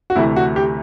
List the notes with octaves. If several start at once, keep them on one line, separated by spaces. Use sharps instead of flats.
F#4
D2 C3 E3 A3 E4
F#4
G4